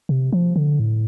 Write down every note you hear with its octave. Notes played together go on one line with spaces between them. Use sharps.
C3
F3
D3
A2